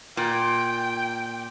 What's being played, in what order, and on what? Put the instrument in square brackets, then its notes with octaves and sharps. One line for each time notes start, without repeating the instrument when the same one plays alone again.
[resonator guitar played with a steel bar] A#2 [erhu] G5